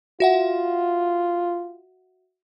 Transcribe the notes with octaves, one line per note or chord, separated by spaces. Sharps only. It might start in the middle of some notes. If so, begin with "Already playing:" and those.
F4 F#4 E5 F#5